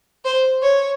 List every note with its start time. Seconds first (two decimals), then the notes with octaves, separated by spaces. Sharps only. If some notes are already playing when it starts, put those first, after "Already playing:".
0.25 C5
0.62 C#5